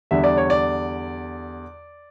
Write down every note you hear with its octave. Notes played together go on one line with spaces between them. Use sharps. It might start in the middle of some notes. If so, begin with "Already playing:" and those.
E2 D3 G3 E5
D5
C#5
D5